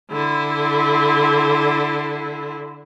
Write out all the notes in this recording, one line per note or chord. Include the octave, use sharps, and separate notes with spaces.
D3 E4